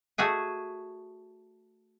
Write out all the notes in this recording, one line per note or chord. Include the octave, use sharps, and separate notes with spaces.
A3 F#4 G#4 G#5